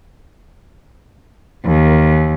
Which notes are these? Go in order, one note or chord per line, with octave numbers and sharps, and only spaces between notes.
D#2